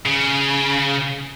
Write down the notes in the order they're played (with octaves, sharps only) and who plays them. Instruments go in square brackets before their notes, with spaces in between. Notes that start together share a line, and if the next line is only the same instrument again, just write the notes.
[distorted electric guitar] C#3